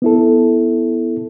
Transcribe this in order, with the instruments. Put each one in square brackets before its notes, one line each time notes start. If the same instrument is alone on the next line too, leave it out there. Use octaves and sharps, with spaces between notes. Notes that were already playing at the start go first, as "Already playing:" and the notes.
[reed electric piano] B3 E4 A4